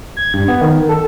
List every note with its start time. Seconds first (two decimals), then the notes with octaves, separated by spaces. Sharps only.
0.17 G#6
0.34 G2
0.48 B3
0.62 D#3
0.89 A4